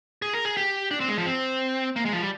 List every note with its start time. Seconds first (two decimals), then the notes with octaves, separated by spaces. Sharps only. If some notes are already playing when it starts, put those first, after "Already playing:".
0.22 G#4
0.34 A#4
0.45 G#4
0.57 G4
0.91 D4
1.00 C4
1.08 G#3
1.18 F3
1.26 C4
1.96 A#3
2.05 G#3
2.13 F3
2.22 G3